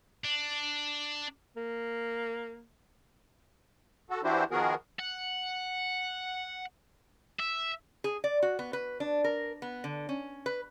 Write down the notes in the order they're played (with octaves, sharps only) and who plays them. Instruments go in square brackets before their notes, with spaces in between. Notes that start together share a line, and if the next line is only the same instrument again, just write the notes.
[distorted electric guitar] D4
[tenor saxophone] A#3
[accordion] F#4 A4
E3 D4 E4 F#4 G4 C5
D#3 F3 B3 F#4 G#4 A#4
[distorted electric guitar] F#5
E5
[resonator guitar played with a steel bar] G#4
D5
F#4
B3
B4
D4
A#4
B3
D3
C#4
B4